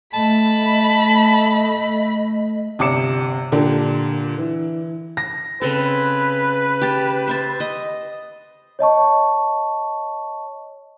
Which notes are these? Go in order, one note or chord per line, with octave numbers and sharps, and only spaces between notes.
A3 D#5 A5 B5
G1 C3 D5 D6 C#7 E7
A#2 D3 D4 G4
E3
A#6
C#3 C4 A4 B4
G4 A5
C5 E5 A5
D#5
C#5 D#5 A5 C#6